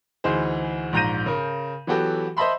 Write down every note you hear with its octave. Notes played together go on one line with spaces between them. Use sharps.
D2 E3 D#4 G#4 C5
A#1 G#2 A#5 G6 A#6 D#7
C#3 A#4
E3 F#3 B3 F#4 G4 A4
C5 D#5 E5 A5 B5 C6